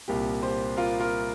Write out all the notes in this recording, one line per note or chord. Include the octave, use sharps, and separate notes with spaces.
C2 A#2 A#3 G4
G4 C5
F4 A#4
F4 A#4